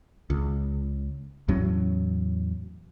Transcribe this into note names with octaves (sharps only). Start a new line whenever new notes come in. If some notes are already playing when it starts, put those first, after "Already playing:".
C#2
E2 A2 F#3 C#4